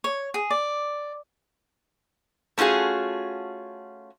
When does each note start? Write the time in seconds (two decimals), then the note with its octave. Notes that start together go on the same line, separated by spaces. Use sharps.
0.04 C#5
0.34 G#4
0.50 D5
2.58 A3 C#4 F4 F#4 G#4